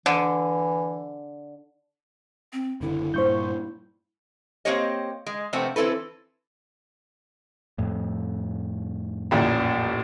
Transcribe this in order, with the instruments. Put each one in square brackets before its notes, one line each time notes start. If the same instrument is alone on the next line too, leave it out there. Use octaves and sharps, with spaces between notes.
[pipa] D3 [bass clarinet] E3
[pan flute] C4
[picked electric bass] F#1 D3 [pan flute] E4
[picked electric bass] G2 A#2 [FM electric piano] C5 C#6 G6
[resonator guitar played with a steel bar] A#3 C4 G4 C5 C#5 D#5
G#3
C3 F3 A3 B3 C4
E3 C4 E4 A4 B4
[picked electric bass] F2 A2
[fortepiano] A1 F#2 A#2